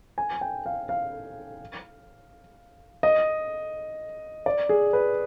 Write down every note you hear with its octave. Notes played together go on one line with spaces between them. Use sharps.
G#5
G5
F5
F5
D#5
D5
G#4
B4